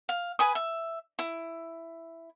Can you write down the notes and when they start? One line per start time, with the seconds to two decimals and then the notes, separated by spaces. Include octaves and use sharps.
0.09 F5
0.39 B4 G#5 B5 D#6
0.55 E5
1.19 E4